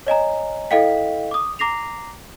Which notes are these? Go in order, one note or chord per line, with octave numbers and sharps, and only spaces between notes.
C#5 D#5 G#5 A#5
E4 A4 D#5 F5 G5 B6
D6 D#6
A#5 D6 A#6 C7 F7